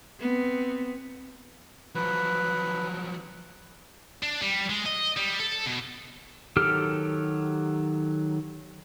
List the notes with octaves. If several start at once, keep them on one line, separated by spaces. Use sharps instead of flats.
B3 C4
F3 F#3 B4
D4
G3
G#3
D#5
G3
A4
B2
D#3 F#3 G4 A4 F6